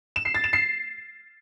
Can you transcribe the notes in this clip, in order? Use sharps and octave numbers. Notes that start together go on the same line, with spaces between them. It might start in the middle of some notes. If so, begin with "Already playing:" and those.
E7
C7
A6
E7
C7